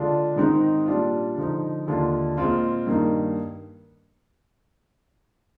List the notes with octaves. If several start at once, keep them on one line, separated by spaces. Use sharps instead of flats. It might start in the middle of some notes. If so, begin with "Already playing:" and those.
Already playing: D3 G#3 D4 F4
G#2 D#3 G#3 C4 D#4
A#2 G3 D4 F4
D3 F3 G#3 D#4
D#2 D3 G#3 D4 F4
A#2 G#3 C4 F4
G2 D#3 A#3 D#4